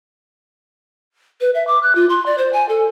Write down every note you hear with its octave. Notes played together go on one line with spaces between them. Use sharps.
B4
E5
D6
F#6
F4
C6
D5
C5
G#5
A4